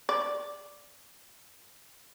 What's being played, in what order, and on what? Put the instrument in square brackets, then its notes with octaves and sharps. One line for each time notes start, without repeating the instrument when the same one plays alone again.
[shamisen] D5